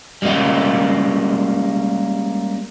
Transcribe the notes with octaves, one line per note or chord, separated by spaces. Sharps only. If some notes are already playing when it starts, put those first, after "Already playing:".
G3 G#3 A#3 C#4 D#5